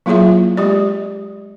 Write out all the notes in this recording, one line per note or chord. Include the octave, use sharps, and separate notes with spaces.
F#3 A#3 E4 F4 G#4 E5
G#3 G4 D5